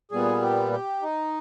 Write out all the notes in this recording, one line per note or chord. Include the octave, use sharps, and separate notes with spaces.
A#2 G3 B3 G#4
G4
G4
D#4